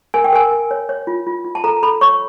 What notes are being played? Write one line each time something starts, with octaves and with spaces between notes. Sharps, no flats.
A#4 G#5
G5
A#4 G#5
A#4
C#5
C#5
F4
F4
F4
A5
A4 A#5
A4 B5
C#5 C#6